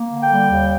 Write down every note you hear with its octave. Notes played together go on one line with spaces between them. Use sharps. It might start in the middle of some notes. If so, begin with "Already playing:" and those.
Already playing: A#3
D3
G5
G3
D#2